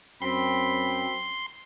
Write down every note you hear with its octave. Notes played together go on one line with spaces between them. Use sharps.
F#2 C4 B5 C6